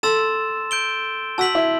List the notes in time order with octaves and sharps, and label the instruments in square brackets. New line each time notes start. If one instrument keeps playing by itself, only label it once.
[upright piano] A4 [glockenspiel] C6 E6 A6 E7
[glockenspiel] G6 D7 G7
[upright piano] F#4 [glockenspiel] A5 E6 B6 F#7
[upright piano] E4